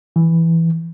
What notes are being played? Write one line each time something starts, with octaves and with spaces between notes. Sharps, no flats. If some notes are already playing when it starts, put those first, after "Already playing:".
E3